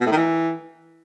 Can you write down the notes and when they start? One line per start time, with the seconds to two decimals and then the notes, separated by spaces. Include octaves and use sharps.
0.01 B2
0.06 A2
0.12 D#3
0.17 E3